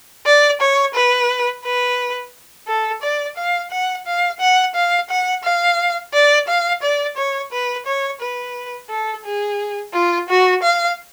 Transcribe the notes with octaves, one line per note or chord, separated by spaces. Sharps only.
D5
C#5
B4
B4
A4
D5
F5
F#5
F5
F#5
F5
F#5
F5
D5
F5
D5
C#5
B4
C#5
B4
A4
G#4
F4
F#4
F5